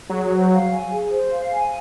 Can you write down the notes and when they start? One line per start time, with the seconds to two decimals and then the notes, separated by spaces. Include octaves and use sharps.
0.09 F#3 G#4
0.29 C5
0.51 F5
0.70 G#5
0.91 G#4
1.11 C5
1.31 F5
1.51 G#5